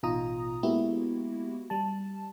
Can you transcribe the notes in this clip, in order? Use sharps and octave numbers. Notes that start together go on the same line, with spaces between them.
A1 B2 D#4 F4 A#5 D#6
G#3 A#3 B3 E4 F#4 G4
G3 A5